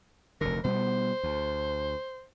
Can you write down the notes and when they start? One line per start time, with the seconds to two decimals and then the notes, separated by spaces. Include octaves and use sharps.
0.41 F1 D2 D3 A#4
0.64 B2 G3 B3 C5
1.23 D2